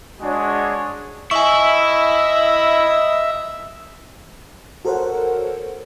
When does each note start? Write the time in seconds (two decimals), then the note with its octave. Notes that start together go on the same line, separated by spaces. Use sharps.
0.21 G#3 D4 F#4 G#4 C#5
1.31 E4 D#5 E5 G#5 C#6
4.85 F#4 A4 A#4 C5 C#5 F#5